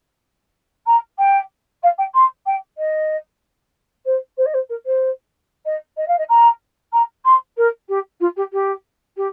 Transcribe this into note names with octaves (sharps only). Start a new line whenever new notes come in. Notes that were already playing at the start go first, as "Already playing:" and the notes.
A#5
G5
F5
G5
C6
G5
D#5
C5
C5
D#5
C5
A#4
C5
D#5
D#5
F5
D#5
A#5
A#5
C6
A#4
G4
F4
G4
G4
G4